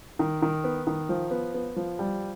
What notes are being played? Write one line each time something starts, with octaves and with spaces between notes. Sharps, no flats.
D#3
D#3
B3
D#3
F3
B3
B3
F3
G3